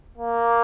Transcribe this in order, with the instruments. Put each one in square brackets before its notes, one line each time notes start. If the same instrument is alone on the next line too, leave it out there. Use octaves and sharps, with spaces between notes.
[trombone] A#3